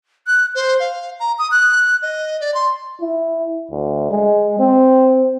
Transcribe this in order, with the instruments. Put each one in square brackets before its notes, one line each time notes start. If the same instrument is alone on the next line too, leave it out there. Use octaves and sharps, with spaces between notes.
[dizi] F#6
C5
F5
A#5
D#6
F#6
D#5
D5
C6
[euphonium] E4
D2
G#3
C4